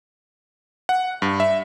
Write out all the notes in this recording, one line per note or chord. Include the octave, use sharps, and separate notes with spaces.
F#5
G2
E5